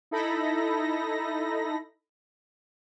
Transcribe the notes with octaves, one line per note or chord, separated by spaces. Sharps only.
D#4 E4 A4 B5 A#6